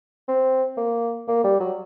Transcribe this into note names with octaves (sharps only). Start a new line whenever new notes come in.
C4
A#3
A#3
G3
F#3